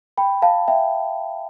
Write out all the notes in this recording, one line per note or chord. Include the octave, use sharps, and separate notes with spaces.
G5 B5
F5 A5
E5 G5